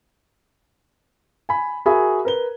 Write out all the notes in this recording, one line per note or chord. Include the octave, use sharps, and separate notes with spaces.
G#5 B5
F#4 G#4 A#4 E5 G#5 B5
A#4 B4 G7